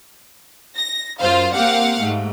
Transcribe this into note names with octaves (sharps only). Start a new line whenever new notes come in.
A#6
F#2 F4 C5 F5
A#3 C4 G4 F5 F#5
G#2 A3